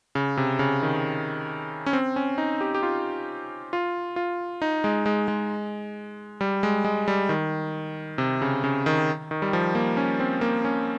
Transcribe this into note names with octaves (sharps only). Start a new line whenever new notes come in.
C#3
C3
C#3
D#3
C#4
C4
C#4
D#4
G4
G4
F4
F4
F4
D#4
G#3
G#3
G#3
G3
G#3
G#3
G3
D#3
C3
C#3
C#3
D#3
D#3
G3
F3
A#3
C#4
C4
A#3
C#4